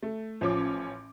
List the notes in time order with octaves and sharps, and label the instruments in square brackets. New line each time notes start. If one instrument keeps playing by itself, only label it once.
[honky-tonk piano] A3
[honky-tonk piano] A1 C#4 D6 [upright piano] F3